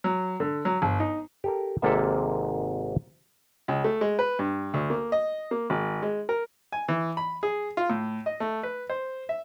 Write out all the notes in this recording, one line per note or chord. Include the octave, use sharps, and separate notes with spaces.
F#3
D3
F#3
G1
D#4
G4 A4 A#4
G#1 G#2 C3 A#3 A4 E5
C#2
A3
G#3
B4
G2
D2
A#3
D#5
A#3
G#1
G#3
A#4
G#5
E3
B5
G#4
F4
A2
D#5
A3
B4
C5
E5